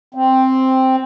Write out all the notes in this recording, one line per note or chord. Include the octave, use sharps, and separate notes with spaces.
C4